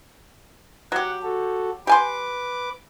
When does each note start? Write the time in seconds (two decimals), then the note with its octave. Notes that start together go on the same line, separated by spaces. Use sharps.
0.92 F#3 G4 F#5
1.23 F#4 A4
1.87 G4 B4 G#5 C6 D6